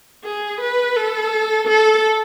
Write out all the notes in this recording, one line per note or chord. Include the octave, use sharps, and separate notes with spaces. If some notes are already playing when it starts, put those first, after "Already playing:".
G#4
B4
A4
A4